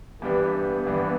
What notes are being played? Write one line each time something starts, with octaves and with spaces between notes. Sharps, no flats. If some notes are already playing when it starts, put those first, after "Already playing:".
G2 E3 G3 B3 D4 G4
B3
G2 E3 G3 D4 G4